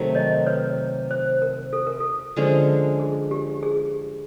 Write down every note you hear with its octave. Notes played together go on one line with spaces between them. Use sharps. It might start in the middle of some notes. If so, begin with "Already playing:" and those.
Already playing: C3 D#3 F#3 A3
C#5 D#5
B4 C#5
C5
A#4
A4
A#4
A4
D3 F3 G#3 C#4
G#4
G4
G#4